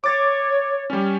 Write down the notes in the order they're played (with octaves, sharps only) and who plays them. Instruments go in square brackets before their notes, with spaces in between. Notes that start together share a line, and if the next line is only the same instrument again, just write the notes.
[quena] C#5 [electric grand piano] D6 A6
[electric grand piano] G3 C#4